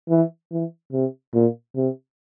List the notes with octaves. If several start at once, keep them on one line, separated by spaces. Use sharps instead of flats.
E3
E3
C3
A#2
C3